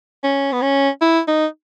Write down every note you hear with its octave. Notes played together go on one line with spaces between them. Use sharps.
C#4
B3
C#4
E4
D#4